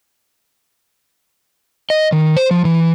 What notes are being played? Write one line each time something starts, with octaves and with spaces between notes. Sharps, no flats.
D#5
D#3
C5
F3
E3